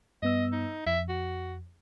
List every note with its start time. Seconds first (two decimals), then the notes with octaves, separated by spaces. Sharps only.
0.23 G2 B3 D#5 E6
0.52 D#4
0.86 F2 E5
1.09 F#4